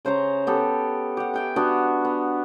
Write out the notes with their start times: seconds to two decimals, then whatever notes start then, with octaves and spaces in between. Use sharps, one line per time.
0.05 C#3 C5 C#5 A#5
0.47 B3 G4 A4
1.17 G4 F#5
1.34 E5 G5 G#5
1.56 B3 D4 F#4
2.04 B3